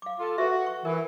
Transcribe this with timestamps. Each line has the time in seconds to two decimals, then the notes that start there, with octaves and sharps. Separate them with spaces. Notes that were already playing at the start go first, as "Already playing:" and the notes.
0.02 F5 D6
0.20 F4 A4
0.38 F#4 A4 B4 E5
0.66 C#6
0.85 E3 A#4